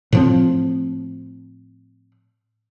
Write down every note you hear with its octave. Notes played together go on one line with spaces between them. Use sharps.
A2 F3 C4